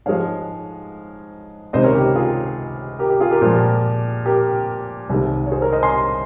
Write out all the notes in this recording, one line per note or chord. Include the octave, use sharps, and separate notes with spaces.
G#2 F3 G#3 C#5 F5
C#2 C3 D#3 C5 D#5
A#4 C#5
G4
G4
F4 G#4
G4 A#4
G4
F4 G#4
G4 A#4
A#2 F3 G#3
G4 A#4
C2 C3 D#3 G#3
C#5
G#4 C5
A#4 C#5
C5 D#5
G#5 C6